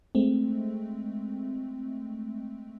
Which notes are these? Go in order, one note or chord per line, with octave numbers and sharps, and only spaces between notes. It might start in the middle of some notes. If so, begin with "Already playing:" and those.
G#3 A3 C4